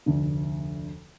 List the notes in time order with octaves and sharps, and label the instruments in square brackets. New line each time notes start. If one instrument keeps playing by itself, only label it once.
[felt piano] F1 D2 D3